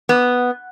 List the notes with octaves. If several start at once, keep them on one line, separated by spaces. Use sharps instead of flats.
B3